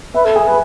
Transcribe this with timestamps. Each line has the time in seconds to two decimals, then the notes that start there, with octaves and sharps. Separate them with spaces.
0.14 B4 E5
0.25 A4
0.35 G#4 G#5
0.47 B4